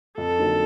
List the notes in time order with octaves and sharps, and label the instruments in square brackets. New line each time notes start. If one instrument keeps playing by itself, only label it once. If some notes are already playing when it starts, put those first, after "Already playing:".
[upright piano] F2 [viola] A4
[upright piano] D3 F#3 A#3 D#4